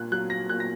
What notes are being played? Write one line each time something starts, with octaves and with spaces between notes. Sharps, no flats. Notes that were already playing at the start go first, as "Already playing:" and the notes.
Already playing: A#2 F#6
F#3 F#6
A#6
A#2 F#6
A#6